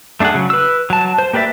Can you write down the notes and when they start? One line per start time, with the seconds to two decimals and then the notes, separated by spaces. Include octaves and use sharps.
0.20 A3 D4 F#4 G#4 F#5
0.34 C#3 F#3
0.50 B4 E6
0.90 F#3 A5
1.18 C5
1.33 A#3 G4 B4 D5 E5